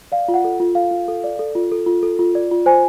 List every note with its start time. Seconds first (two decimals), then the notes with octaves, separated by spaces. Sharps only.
0.12 D5 F5
0.28 F4
0.34 F#5
0.44 A4
0.60 F4
0.75 A4 F5
0.91 F4
1.08 A4
1.24 D5
1.39 A4
1.55 F4
1.72 A4
1.86 F4
2.03 A4
2.19 F4
2.35 D5
2.51 F4
2.66 C5 G#5